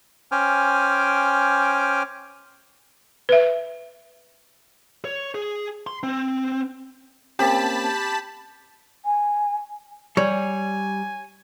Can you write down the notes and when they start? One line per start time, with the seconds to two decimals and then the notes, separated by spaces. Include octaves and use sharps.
0.32 C#4 C5 G5 G#5 D6 F6
3.29 B4 E5
5.05 C#5
5.35 G#4
5.87 C6
6.03 C4
7.39 A#3 C4 C#4 G4 A5 B5 B6
9.05 G#5
10.17 G3 C#5 G#5